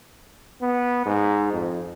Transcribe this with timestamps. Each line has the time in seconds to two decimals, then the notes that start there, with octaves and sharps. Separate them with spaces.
0.62 B3
1.06 G#2
1.52 F2